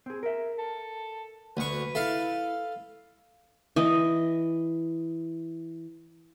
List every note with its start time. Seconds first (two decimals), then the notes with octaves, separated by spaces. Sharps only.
0.06 C4 G#4
0.23 A#4 E5
0.58 A4
1.57 D2 B4 C#6
1.95 E4 A4 E5 F5
3.76 E3 D#5